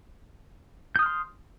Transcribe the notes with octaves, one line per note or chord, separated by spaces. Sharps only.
C6 D#6 F6 G6